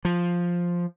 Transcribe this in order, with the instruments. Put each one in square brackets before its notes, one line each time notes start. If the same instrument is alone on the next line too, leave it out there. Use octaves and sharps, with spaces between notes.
[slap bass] F3